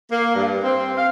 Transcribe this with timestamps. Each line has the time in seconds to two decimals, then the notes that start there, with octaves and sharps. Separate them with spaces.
0.11 A#3
0.35 G2
0.64 C4
0.97 F5